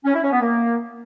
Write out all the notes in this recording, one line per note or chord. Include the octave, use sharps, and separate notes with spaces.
C#4
E4
C#4
B3
A#3